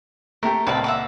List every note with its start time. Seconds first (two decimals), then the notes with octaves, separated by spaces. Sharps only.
0.43 A3 G4 A#4
0.67 C#2 A#2 C4 B4 D5 A5
0.84 E5 F#5 D6